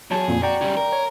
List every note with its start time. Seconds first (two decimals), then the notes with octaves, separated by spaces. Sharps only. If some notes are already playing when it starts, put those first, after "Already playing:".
0.11 E2 F#3 G#4 A5
0.28 F2 A#2
0.43 F#4 D5 G5 A#5
0.61 C#3 G3
0.77 A#4
0.92 C#5